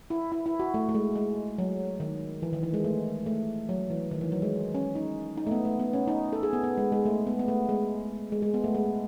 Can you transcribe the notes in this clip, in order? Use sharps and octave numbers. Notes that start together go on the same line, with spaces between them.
E4
E4
E4
F#4
A3
A3
G#3
G#3
F#3
D#3
E3
D#3
E3
G#3
A3
A3
F#3
E3
D#3
E3
F#3
G#3
C#4
D#4
D#4
A3
B3
A3
B3
C#4
D#4
A4
G#4
B3
B3
G#3
G#3
A3
B3
B3
A3
G#3
G#3
G#3
B3
A3
G#3